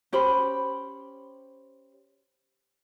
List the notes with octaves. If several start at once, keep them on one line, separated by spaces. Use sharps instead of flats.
C#4 G4 C5 B5